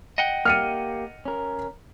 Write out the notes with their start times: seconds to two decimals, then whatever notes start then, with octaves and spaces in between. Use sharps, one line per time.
0.18 D#5 F#5 G5
0.45 A#3 G4 F6 C#7 D#7
1.25 C#4 A#4